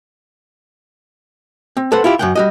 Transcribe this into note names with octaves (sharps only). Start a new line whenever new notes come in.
C4
A4 B4 C5 F#5
E4 F4 G4
F#2 F#5 G5
G3 F#4 D#5